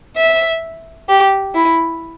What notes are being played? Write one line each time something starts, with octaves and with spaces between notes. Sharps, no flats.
E5
G4
E4